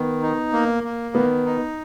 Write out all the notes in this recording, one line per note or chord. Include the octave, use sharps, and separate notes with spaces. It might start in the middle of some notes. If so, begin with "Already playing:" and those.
Already playing: D#3 B3
D#4
A#3
A#3
D#3 B3
D#4